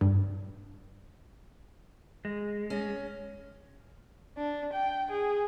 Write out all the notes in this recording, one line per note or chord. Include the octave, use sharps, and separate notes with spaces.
G2
G#3
C#4
D4
G5
G#4